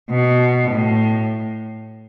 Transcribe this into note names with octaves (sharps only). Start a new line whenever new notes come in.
B2
A2